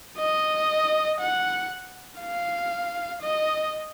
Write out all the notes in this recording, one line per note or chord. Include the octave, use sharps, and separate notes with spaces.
D#5
F#5
F5
D#5